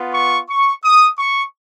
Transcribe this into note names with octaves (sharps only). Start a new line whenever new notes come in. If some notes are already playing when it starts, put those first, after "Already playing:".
Already playing: B3 F4
C#6
C#6
D#6
C#6